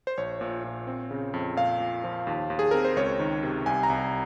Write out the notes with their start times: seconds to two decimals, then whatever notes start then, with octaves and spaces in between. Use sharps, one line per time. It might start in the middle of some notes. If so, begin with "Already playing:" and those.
0.07 C5
0.17 A#1 C#5
0.41 A#2
0.64 A#2
0.87 C4
1.11 C#3
1.34 F2
1.57 A#2 F5
1.80 A#2
2.04 F3
2.27 D#2
2.50 D#2
2.59 G#4
2.71 C4 A#4
2.85 C5
2.96 C#2 C#5
3.20 D#3
3.43 C3
3.66 C2 G#5
3.83 A#5
3.90 C2